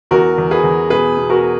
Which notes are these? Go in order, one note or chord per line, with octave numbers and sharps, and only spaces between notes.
E2 F#4 A#4
E2
G#4 B4
E2
B2 G#4 B4
B2
F#4 A#4